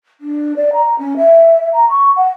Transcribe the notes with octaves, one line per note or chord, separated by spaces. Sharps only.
D4
D5
A#5
C#4
E5
A#5
C#6
F#5